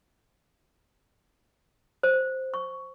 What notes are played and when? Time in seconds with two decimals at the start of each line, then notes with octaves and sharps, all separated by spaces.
2.03 C5
2.54 C#6